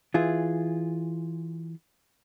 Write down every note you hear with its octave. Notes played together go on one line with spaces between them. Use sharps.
E3 F4 G#4